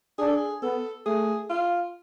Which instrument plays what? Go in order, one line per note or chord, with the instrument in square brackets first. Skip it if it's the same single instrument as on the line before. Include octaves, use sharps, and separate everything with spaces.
[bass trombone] D4 [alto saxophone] G#4
[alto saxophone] A4
G#4
[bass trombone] B3 [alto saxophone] A4
[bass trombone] A3 [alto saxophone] G#4
[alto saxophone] F4